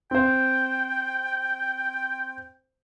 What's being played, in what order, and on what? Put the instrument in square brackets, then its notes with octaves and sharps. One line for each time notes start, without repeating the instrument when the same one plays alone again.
[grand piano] C4 C5 [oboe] G5